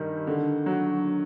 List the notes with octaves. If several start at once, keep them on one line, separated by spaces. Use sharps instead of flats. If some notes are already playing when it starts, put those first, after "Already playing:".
Already playing: G2 D#3 G3
D3
F#3